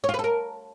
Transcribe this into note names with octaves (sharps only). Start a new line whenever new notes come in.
C#5
F4
B4
A4
A#4